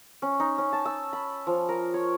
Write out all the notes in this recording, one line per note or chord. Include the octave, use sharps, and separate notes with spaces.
C#4
D#4
C#4
A5
E6
B5
F3
A#4
C#5